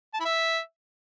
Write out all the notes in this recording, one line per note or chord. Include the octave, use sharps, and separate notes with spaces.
A5
E4
E5